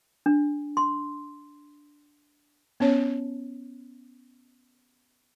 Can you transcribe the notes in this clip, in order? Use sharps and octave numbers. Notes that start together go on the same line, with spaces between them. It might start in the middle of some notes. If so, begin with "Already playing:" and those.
D4
C6
B3 C#4 C#5